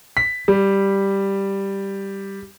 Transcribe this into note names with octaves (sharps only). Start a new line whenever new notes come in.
B6
G3